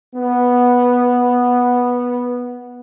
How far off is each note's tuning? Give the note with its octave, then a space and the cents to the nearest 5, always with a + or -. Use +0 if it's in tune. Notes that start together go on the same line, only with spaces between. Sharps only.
B3 -10